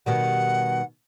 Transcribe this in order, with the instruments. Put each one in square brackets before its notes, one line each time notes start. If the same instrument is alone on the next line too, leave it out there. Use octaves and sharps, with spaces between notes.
[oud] B2 D#3 G3 [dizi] F#5